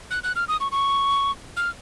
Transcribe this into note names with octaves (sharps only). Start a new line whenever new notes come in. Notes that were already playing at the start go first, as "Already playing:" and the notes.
F#6
F#6
F6
D#6
C#6
C#6
F6